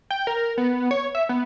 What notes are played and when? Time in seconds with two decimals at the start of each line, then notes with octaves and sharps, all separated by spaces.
0.10 G5
0.27 A#4
0.57 B3
0.91 C#5
1.15 E5
1.29 B3